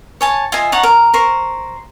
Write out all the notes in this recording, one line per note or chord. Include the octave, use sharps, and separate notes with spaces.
C#5 G#5 A5
F4 D#5 E5 G#5
D#4 C#5 F#5 A5
A#4
A#4 C5 C#6